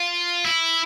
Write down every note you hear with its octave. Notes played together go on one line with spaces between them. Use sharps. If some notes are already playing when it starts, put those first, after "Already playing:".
Already playing: F4
E4